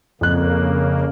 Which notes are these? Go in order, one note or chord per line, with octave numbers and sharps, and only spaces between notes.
F2 C#3 A#3 F#6